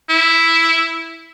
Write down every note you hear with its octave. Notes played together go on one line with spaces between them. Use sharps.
E4